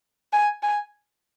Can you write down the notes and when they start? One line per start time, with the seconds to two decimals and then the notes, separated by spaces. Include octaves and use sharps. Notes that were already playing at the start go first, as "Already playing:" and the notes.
0.33 G#5
0.63 G#5